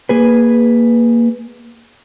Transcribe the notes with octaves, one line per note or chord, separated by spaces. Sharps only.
A#3 G#4 B4